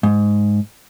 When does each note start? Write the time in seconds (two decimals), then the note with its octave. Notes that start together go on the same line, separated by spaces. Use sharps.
0.03 G#2